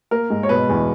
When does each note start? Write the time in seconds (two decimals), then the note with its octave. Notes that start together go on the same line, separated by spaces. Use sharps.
0.11 A#3 A#4
0.30 G#2
0.43 C#5
0.49 B2 B4
0.69 E2